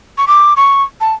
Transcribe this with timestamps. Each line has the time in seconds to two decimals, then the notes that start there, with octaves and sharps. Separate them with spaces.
0.18 C#6
0.28 D6
0.57 C#6
1.01 A5